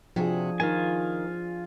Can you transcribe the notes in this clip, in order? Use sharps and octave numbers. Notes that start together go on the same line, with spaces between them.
C3 F3 D4 F#4 G#4
D#3 F4 G#5